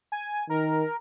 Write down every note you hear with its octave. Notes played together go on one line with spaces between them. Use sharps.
G#5
D#3 A#4